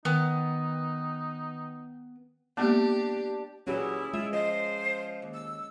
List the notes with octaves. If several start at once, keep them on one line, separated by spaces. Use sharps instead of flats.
D#3 B3 D#4 G5
G#3 A#3 B3 D4 G4 A5
A#2 E3 F#3 G3 C#4 E4 G#4
G#3 F4 E5
F3 C5 D#5
D#2
E6